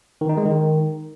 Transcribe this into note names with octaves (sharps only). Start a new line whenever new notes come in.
D#3
D#4
G#3
D#3